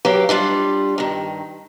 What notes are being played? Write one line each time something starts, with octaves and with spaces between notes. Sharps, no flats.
F#3 G4 A#4 B4 F5
G3 D4 F4 D5
G2 D#3